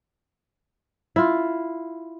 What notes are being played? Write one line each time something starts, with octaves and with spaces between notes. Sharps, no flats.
E4 F4